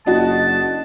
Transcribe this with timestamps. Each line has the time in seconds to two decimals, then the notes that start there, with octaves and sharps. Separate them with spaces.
0.06 F#1 D4 F#4 D#5 A5